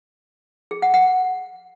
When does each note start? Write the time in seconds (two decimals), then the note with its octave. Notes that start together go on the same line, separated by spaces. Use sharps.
0.71 G#4
0.82 F#5
0.94 F#5